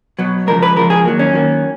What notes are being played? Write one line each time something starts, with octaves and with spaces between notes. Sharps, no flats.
B2 F#3 B3
C#3 F3 G#3 A#4
B4
C#3 F3 G#3 A#4
G#4
D#3 F#3 A#3
C#4
D#3 F#3 A#3